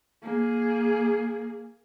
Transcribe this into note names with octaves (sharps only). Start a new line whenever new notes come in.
A#3 G#4